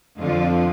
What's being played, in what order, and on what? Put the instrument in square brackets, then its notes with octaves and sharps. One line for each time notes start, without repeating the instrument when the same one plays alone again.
[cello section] F2 D3 F3 F4